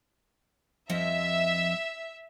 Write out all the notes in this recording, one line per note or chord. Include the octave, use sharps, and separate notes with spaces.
F2 F3 D#5 E5